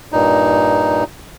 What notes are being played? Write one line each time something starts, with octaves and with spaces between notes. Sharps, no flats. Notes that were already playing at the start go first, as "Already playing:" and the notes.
G2 A#2 D#4